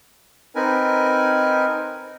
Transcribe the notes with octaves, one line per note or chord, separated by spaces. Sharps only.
C4 D#4 A#4 B4 G#5